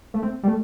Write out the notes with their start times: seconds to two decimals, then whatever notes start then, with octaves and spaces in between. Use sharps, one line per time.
0.14 A3
0.23 C4
0.43 G3
0.48 A3